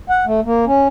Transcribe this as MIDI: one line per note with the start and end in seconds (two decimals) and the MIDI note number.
0.09 0.25 78
0.26 0.40 57
0.45 0.65 58
0.66 0.88 61